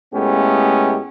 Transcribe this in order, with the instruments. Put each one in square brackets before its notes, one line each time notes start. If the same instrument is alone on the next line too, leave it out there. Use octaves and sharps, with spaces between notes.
[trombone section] A2 G#3 A3 B3 C#4 G4